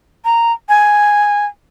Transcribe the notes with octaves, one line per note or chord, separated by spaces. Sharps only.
A#5
G#5